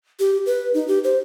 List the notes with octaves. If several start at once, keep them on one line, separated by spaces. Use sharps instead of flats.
G4
B4
D#4
G4
C5